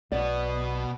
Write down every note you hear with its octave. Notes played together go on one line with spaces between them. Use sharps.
B1 B2 B3 D5